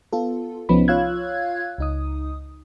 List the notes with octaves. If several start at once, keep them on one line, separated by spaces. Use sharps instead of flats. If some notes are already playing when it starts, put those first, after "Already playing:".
B3 F4 A4
C2 F3 B3 C#4 D#4 B5
F4 C#5 F5 E6 F#6 G#6
C#2 D#4 D#6